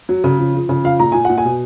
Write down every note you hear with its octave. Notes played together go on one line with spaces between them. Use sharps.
F#3
C#3
F3
F3
C#3
F3 F5
A#2 A#5
A#2 G#5
A#2 F#5
G#5
B2